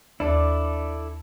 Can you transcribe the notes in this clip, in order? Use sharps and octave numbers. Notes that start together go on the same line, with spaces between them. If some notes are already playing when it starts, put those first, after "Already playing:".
D#2 D4 E4 A4 D5